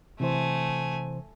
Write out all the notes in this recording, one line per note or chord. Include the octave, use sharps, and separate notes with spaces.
C3 E3 A3 C5 G#5